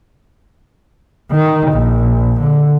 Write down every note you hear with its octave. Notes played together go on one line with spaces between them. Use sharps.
D#3
A#1
D3